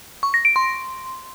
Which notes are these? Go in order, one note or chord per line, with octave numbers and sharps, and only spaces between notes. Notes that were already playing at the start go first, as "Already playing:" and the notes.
C#6
A#6
D7
C6